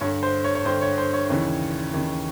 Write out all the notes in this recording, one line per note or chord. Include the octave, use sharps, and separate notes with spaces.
G2 D3 C#5
C5
C#5
C#5
G2 D3 C5
C#5
C5
C#5
D#2 C#3 E3
D#2 C#3 E3